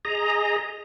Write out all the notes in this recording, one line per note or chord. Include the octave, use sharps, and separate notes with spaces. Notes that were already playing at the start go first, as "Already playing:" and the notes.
G#4 D#5 A#5